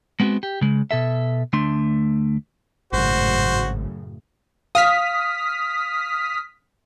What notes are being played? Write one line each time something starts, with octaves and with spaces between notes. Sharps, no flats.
G#3 B3 C4 D#4 F#4
G4
C#3 G#3
B2 A4 E5
D2 A3 D4 C6
G#1 F#2 A2 C#3 F#4 C5
F5 D#6 F6 B6